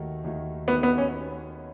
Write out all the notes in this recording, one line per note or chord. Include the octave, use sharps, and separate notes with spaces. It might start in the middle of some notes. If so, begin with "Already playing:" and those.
Already playing: D#2 D#3 A3 D#4 F#4
D#2 D#3 A3 D#4 F#4
D#2 D#3 A3 B3 D#4 F#4
B3
C#4